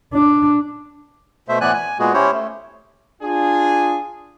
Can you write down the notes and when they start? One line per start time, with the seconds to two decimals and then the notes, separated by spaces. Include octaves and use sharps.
0.13 D4
1.49 B2 A3 C5 E5
1.61 A2 E3 B3 D5 G#5 F#6
1.73 G#5
1.99 A#2 G#3 B3 F#4 G#4
2.14 C#4 E4 G4 C5 C#5
2.32 A3
3.22 D4 F4 G#4